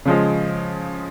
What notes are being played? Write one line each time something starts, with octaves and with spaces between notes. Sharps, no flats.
C#3 F3 G#3